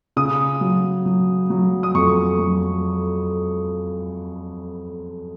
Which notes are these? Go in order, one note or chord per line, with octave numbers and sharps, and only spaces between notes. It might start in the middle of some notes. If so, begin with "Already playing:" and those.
C#3 D#6
F#3
F#3
F#3
D#6
F2 C#6
F#3